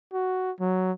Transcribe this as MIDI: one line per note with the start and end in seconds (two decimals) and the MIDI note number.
0.13 0.52 66
0.60 0.92 54